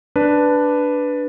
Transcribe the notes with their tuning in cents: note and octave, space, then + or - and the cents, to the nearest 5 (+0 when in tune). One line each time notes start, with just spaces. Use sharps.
D4 +0 B4 +0